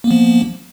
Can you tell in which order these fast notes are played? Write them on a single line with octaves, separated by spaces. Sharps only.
A#3 B3 F3